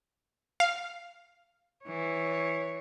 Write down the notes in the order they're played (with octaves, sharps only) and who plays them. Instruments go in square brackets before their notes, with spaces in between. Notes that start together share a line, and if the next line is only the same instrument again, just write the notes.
[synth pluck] F5
[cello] E3 C#5